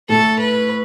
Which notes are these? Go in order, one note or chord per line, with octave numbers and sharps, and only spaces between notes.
A2 A4
B4